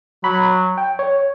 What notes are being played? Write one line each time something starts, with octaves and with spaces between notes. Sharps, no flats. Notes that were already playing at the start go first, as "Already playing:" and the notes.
F#3 B5
G5
C#5